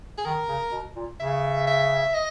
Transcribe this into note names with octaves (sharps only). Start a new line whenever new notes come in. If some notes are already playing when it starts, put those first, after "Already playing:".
G#4
D#3 A#4
C#3
B2
A#2
C#3 E5
E5
D#5